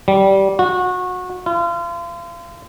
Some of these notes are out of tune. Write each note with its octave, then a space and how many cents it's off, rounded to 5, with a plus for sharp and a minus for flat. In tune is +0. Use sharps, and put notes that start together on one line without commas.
G3 -15
F#4 -25
F4 -35